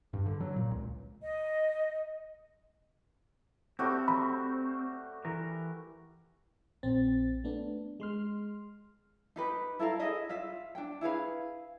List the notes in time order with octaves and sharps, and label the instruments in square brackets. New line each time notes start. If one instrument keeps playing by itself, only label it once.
[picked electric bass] G2
D3
F#3
A#2
C#2
[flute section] D#5
[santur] G3 A3 F#4 [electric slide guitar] C4
[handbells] B5
[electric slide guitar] E3 A#4
[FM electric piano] A#1 C4 A6
A3 B3 D4
G#3 C6 F6
[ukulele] D#4 G4 B4
E4 A4 A#4 F5
E4 G#4 D#5 E5
F4 E5
D4 G5
E4 G#4 B4 F5